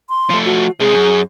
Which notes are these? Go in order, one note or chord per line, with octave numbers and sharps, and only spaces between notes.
C6
F3 A3
F#4
C3 G#3 G#4
F#2